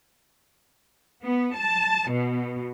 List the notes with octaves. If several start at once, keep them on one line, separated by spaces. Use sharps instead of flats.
B3
A5
B2